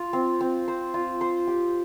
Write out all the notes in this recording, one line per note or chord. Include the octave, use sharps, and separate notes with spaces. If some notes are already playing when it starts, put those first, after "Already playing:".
Already playing: F4
C4
C4
C5
F4
C5
G4